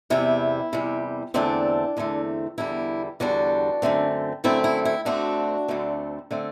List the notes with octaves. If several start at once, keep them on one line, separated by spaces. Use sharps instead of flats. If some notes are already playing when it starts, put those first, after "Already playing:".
E2 C3 G3 E4
E2 C3 G3
E2 D3 A3 C4 D4
E2 D3 A3 C4
E2 D3 G3 E4
E2 D3 G3 D4 F#4
F#2 D3 A3 C4
F#2 D3 A3 C4 E4
E4
E4
D2 D3 A3 C4 D4 F#4
D2 D3 A3 C4
D3 A3 C4